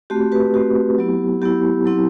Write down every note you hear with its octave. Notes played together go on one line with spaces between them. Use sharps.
A3 C4 F#4 G4
G4 B4
A3 C4 F#4 G4
F#3 B3 E4
F#3 B3 E4 G4
F#3 C4 E4